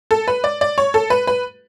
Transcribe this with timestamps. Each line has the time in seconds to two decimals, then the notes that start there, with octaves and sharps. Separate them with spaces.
0.11 A4
0.28 B4
0.44 D5
0.61 D5
0.78 C#5
0.94 A4
1.10 B4
1.27 B4